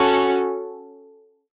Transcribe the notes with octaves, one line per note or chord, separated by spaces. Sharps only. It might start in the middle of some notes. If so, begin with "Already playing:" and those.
Already playing: C#4 F#4 A4